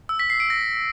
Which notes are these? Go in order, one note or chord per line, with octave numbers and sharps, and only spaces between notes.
E6
B6
C7
D7
A#6